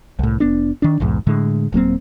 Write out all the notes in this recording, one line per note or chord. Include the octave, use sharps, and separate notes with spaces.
C2 A2
F1 B3 D4
D#3 D4
B1 E2 G#2
A2 D3 G#3
D#1 F#3 A#3 C4